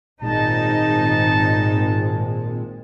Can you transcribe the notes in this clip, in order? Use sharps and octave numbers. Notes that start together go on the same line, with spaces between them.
G#1 A#2 G#3 C4 D#4 A5